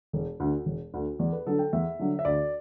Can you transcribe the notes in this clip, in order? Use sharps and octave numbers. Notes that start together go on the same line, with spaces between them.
E1
D2 D3
E1
D2 D3
E2 D5
B4
D3 F#3 A4
G5
E2 E5
D3 F#3
E5
D2 D5